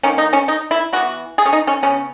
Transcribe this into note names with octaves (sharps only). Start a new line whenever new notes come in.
D#3 A#3 C#4
D#4
C#4
D#4
E4
E3 B3 F#4
G#4
C#4
D#4
C#4
C#3 E3 B3 C#4